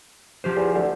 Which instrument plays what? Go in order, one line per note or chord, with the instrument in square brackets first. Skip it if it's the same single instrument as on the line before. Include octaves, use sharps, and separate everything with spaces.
[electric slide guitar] F3 G4 C5
[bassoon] E2
D2